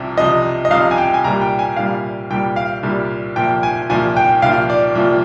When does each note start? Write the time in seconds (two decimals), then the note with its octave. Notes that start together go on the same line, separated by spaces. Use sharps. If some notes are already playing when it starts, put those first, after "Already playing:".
Already playing: C2 C3 F3
0.17 C2 C3 F3 D#5
0.65 D#5
0.71 C2 C3 F3 F5
0.91 G#5
0.98 G5
1.14 G#5
1.24 C2 A#2 G3 A#5
1.41 G5
1.59 G#5
1.76 C2 A#2 G3 F5
2.30 C2 A#2 G3 G5
2.56 F5
2.83 C2 A#2 G3
3.36 C2 A#2 F3 G5
3.63 G#5
3.90 C2 A#2 F3 G#5
4.17 G5
4.42 C2 A#2 F3 F5
4.70 D5
4.95 C2 A#2 F3